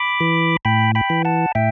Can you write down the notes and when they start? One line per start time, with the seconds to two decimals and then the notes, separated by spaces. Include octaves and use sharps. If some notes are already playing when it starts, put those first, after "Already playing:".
Already playing: B5 D6
0.21 E3
0.65 A2 G5 B5
0.95 G5 B5
1.10 E3
1.25 F#5 A5
1.55 A2 E5 G5